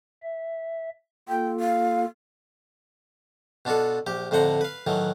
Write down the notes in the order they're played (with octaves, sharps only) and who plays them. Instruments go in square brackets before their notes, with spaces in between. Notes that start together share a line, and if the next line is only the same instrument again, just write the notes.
[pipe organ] E5
[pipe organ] A#3 F4 A4 [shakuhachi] G5
[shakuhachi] F5
[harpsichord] B2 D4 F4 F#4 A4
A#1 G4
F2 A2 D3 C5 F#5 A#5
B4 F5
A2 D#3 E3 F#3